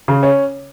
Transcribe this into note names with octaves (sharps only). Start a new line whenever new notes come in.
C#3
C#4